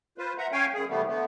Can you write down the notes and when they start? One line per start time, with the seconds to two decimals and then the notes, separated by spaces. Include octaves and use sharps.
0.18 F4 B4 C5
0.38 E5 F#5 A#5
0.52 C#4 C#5 F5 G5 G#5
0.74 F#2 G#4
0.89 A2 C3 E3 G3 A3 B3
1.07 D3 A3 B3